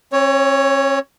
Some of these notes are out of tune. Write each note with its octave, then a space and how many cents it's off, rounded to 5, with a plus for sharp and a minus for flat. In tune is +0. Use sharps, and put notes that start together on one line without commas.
C#4 -45 C#5 +5